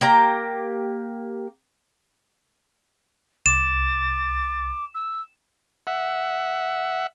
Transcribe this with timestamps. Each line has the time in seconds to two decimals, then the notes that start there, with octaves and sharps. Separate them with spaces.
0.01 A#3 G4 A#5
3.46 C2 D6 A6 E7
4.94 E6
5.87 E5 F#5